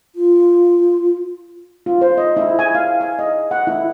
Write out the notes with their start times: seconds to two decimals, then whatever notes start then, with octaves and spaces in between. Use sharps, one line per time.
0.15 F4
1.86 F4
2.01 C5
2.18 D#5
2.37 E4
2.59 G#5
2.75 F5
3.01 G#5
3.19 D#5
3.51 F#5
3.67 E4